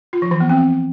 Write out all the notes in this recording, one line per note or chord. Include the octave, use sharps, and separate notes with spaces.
F4
F3
E3
B3
C4